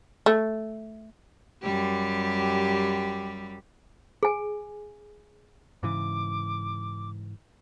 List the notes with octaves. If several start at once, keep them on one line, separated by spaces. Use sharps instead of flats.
A3
F#2 G3 G4
G#4 G#5
G#2 C#3 E3 D6